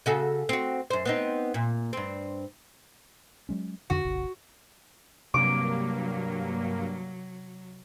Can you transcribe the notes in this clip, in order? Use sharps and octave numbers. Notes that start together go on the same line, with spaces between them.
C#3 F#4 A4
C4 F#4
F#2 C5
B3 C4 D#4
A#2
G2 C4
F#3 G#3 C#4
F2 D3 D4 F#4
F1 A#1 C#3
G2 C3 F#3 A#3 D6